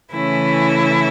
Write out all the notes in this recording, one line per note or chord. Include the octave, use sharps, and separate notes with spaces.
C#3 E3 A3 C#4 E4